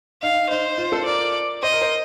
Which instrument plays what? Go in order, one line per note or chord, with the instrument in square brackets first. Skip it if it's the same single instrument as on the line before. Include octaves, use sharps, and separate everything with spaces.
[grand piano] D#4 [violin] F5
[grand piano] D#4 [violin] C5
[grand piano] F4
A4
[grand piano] A#4 [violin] D5
[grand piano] C5 [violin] D#5
[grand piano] A#4
C5